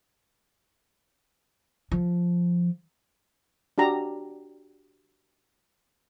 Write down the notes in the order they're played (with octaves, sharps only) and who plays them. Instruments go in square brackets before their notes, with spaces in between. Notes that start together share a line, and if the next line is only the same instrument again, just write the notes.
[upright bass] F3
[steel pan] D4 F#4 G4 A#5